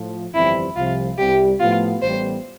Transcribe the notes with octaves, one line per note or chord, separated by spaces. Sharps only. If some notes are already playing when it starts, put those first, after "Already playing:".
Already playing: A2 F3
G1 F2 E3 G3 C4 E4
C2 C3 F3 F4
C2 C3 G3 G4
A2 F3 B3 F4
A1 A2 G3 B3 C5